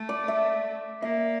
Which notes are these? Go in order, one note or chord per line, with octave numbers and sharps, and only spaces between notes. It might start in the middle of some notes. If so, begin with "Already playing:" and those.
Already playing: A3
D5
E5
A#3 E5